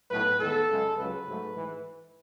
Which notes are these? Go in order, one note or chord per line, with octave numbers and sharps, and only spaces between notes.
B1 A2 F#3 A3 B4
E2 D#3 G#3 B3 A4
F#2 C#3 G#3
C#2 C#3 F#3 B4
G#2 F#3 A3
G#2 E3